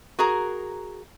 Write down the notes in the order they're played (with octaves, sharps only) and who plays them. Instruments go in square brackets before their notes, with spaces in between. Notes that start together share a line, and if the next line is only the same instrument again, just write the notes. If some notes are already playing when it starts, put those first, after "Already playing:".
[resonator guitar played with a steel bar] F#4 G#4 A#4 A#5